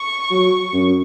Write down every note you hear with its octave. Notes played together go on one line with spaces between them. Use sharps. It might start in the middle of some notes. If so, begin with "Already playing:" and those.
Already playing: C#6
F#3
F#2